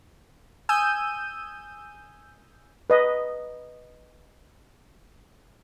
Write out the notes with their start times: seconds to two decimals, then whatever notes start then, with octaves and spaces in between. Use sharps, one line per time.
0.69 G#5 D#6 E6 G6 D#7
2.90 B4 D#5